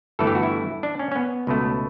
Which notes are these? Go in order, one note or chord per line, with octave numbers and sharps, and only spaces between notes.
G1 G2 E3 A3 A4
G4
F#4
E4
D4
C#4
C#4
B3
C#2 B2 A3